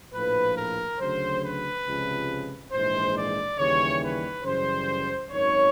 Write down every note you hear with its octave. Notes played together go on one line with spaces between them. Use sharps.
A#1 A2 F3 B4
A#4
D2 C#3 F#3 C5
B4
C#2 C3 F3 G#3
A#1 G#2 E3 G#3 C5
D5
D#2 C#3 E3 G3 C#5
B4
F#2 C#3 E3 G3 C5
G#1 F#2 D#3 C#5